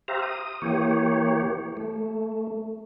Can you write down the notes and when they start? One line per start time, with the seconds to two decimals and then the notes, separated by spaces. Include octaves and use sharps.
0.08 G4 C5 E5 F5 A#5
0.22 D#6
0.62 E3 A#3 G4 C#5
1.77 A3